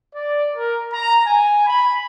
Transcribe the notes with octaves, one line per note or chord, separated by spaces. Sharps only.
D5
A#4
A#5
G#5
B5